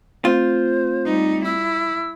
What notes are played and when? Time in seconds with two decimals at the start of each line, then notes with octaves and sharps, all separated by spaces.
0.25 A3 C4 F4 C5
1.05 G3 D#4
1.45 E4 E6